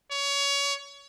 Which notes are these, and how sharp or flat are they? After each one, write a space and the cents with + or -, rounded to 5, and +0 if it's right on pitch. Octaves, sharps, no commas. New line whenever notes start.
C#5 +25